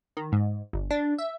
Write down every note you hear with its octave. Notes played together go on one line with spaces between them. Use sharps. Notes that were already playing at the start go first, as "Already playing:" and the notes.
D#3
G#2
G1
D4
E5